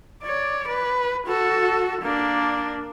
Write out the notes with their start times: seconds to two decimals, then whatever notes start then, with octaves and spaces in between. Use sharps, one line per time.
0.23 C#5 D5
0.68 B4
1.27 F#4 A4
2.02 A#3 D4